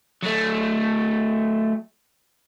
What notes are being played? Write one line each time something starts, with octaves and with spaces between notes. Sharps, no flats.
F#3 A3